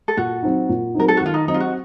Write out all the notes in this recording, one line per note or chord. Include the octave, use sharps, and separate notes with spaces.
A4
A#2 F#4
F#3 C4 D#4
A#2
F#3 C4 D#4 A#4
A4
F#4
D#3 F4
D#4
F#3 C4 D#4
F4
F#4